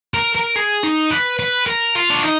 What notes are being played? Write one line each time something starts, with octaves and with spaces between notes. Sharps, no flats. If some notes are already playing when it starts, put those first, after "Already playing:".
A#4
A#4
G#4
D#4
B4
B4
A#4
F4
D4
D#4